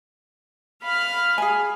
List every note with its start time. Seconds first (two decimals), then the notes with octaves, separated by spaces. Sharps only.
0.83 F5 B5 F6
1.38 G#4 G#5